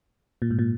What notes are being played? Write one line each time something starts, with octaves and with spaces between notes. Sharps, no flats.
A#2
G#2
A#2